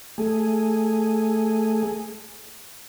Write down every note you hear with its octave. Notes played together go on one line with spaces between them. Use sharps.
A3 G#4